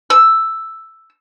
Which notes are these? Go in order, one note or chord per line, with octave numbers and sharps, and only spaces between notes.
E6